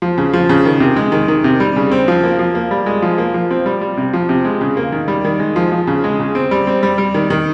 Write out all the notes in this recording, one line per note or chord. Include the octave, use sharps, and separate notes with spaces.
F3
C#3
F3
C#3
D#3
C3
G#3
D#3
D#3
C3
G3
C#3
C4
F3
A#3
F3
A#3
G3
G#3
F3
A#3
F3
C4
G3
G3
C3
F3
C3
G#3
C#3
A#3
D#3
G3
D#3
G#3
F3
F3
C#3
G#3
C#3
C4
G3
C4
G3
G3
D#3
D#3